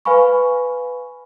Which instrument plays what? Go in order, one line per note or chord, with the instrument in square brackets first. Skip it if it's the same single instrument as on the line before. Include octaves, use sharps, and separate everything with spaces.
[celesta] B4 F5 G#5 B5 C#6